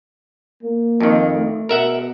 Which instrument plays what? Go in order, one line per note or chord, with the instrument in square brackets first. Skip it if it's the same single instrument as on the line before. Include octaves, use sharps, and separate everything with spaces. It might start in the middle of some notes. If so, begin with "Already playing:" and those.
[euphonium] A#3
[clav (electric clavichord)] F2 D#3
[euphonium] A3
[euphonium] B2 [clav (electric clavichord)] A#4 E5 F#5